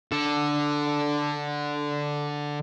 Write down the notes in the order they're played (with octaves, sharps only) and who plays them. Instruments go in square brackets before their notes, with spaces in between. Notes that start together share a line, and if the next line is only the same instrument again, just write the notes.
[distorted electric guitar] D3 A4